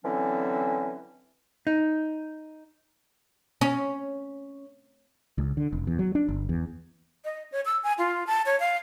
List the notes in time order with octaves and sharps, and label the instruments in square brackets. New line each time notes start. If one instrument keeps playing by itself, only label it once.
[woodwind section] D3 E3 F#3 C4 C#4
[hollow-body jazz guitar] D#4
[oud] C#4
[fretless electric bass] C#2
D3
F1
E2
F#3
D4
G1
E2
[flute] D#5
C#5
E6
G#5
F4
A5
C#5
F5